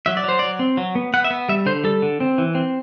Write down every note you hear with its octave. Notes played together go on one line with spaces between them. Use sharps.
F#3 E5
D5
F#3 C5
F#3 D5
C4
F#3
B3
B3 F#5
E5
B3
G3 E5
D3 C5
G3 A4
D3
C4
E3
C4